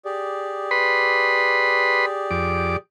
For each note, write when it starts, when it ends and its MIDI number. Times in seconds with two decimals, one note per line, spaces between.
0.05 2.77 67
0.05 2.77 68
0.05 2.77 74
0.71 2.06 71
0.71 2.06 83
0.71 2.06 84
2.31 2.76 41
2.31 2.76 86